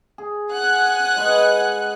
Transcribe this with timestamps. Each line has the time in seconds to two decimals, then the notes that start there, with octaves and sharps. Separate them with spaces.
0.18 G#4
0.53 F#5 G#5 F#6
1.17 G#3 B4 D#5